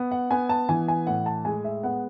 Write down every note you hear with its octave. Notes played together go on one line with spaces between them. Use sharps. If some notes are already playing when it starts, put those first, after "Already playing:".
Already playing: B3
F#5
B3 G#5
A5
E3 G#5
G#5
A2 F#5
A5
G#3 G#5
E5
B3 F#5